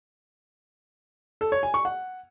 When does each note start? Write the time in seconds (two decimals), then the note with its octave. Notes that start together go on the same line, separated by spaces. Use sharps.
1.41 A4
1.52 C#5
1.63 G#5
1.74 C#6
1.85 F#5